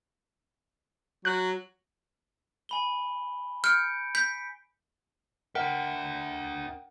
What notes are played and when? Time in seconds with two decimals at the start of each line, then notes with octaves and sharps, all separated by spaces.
1.25 F#3 F#6
2.69 G#5 B5 G7
3.64 F6 G6 C#7 D7
4.15 G6 B6
5.55 D4 A#4 E5 F#5 G5